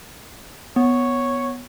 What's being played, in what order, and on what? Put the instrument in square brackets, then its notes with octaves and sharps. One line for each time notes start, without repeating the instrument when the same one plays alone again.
[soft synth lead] B3 [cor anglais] C#5